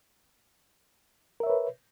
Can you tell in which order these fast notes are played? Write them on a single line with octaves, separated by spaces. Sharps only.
A#4 E5 C#5 B4